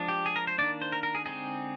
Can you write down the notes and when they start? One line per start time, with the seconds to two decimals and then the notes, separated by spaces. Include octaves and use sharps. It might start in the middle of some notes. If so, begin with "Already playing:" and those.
Already playing: F3 G#3 D4
0.08 G4
0.26 G#4
0.36 A#4
0.47 C5
0.58 D#3 A#3 D4 D5
0.82 C5
0.92 A#4
1.03 A#4
1.15 G#4
1.25 D3 G#3 C4 D#4 G#4